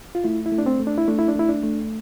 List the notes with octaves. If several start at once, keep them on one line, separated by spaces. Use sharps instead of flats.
F4
A3 E4
E4
A3
D4
C4
A3
D4
E4
A3 D4
E4
D4
A3 E4
D4
A3